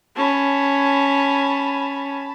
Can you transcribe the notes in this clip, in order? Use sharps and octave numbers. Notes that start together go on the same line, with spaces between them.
C#4 A5 B5